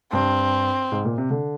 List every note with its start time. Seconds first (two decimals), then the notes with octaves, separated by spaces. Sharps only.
0.12 G2 C4
0.92 G#2
1.05 A#2
1.18 C3
1.30 D3